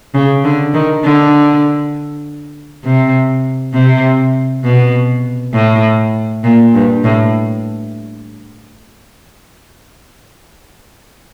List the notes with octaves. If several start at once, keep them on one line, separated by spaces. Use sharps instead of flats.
C#3
D3
D#3
D3
C3
C3
B2
A2
A#2
G2
A2